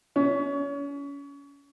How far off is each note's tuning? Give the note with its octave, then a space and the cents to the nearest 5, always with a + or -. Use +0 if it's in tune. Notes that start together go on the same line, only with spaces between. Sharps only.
C#4 +30